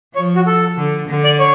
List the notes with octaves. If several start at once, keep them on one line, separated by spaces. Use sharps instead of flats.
F3 C#5
F#4
A4
D3
D3
D5
C#5